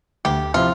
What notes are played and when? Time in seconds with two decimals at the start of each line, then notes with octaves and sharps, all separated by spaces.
0.25 D2 G4
0.54 C3 F3 C4 E4 F4